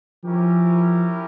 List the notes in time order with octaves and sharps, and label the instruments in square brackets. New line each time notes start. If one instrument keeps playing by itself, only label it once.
[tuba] F3 [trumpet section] C#4 E4 G4 A#4